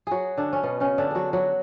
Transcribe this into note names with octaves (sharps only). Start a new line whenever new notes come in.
F#3 F#4 G#4
D3 D4
C#4
B2 B3
C#3 C#4
D3 D4
F#3 F#4 G#4
F#3 F#4